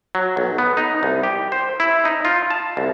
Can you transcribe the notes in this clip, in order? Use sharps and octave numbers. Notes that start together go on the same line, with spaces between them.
F#3
B1
B3
D#4
C2
G4
C5
E4
D#4
F4
A5
C2